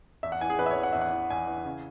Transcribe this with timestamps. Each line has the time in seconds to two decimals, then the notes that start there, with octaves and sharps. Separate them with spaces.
0.23 E2 E5
0.32 F#5
0.41 E3 G#5
0.50 G#4
0.59 E2 B4
0.66 E5
0.71 C#5
0.77 E3
0.83 F#5
0.93 E2 E5
1.02 F#5
1.12 E3
1.30 E2 G#5
1.47 E3
1.65 C#3